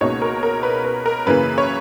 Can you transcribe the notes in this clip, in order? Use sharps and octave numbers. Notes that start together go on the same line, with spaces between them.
C#2 B2 A#3 D#4 C#5
A#4
A#4
B4
B4
A#4
F#2 C#3 E3 A#3 B4
C#5